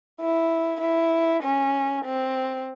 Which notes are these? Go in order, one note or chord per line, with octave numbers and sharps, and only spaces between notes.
E4
E4
C#4
C4